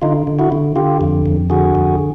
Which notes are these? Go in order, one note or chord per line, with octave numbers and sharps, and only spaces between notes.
D3 D#4 F4
D3
E4 F#4
D3
D3 F4 G4
F2
F2
D3 F#4 G#4
F2